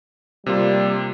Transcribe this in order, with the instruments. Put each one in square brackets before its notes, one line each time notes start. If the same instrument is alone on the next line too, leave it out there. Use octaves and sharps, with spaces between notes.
[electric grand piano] C3 A#3 F4 [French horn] G3